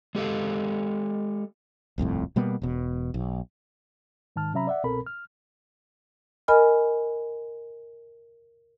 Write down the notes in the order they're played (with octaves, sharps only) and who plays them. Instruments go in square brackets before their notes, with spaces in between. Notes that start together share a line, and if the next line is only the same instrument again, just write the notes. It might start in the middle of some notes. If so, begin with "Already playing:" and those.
[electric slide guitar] G#3 G4 A4 F5
[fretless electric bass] D#1 C2 F2 A2
B2 G3 A#3 B3
E1 B2
B1
[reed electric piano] G#2 D#3 A5 F6
C3 F#3 C#4 E5 A#5 B5
D5 E5 F#5
C2 B2 C4 A4 A#4 B5
F6
[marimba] A#4 D#5 G#5 B5 F6